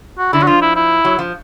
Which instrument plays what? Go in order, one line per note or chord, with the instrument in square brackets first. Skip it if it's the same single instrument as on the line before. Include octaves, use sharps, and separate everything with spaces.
[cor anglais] F#4
[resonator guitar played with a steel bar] D3 [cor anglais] E4
[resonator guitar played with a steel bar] F#3
[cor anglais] F#4
[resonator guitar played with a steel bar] F3 [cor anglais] F4
[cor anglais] E4
E4
[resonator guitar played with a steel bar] F#3
F3